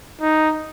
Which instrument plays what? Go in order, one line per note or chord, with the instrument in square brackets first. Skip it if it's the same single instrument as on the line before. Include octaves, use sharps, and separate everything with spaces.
[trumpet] D#4